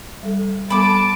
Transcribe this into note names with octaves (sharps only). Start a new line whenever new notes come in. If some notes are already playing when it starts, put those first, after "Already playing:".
G3 A4
G3 B3 A4 A5 B5 D6 D7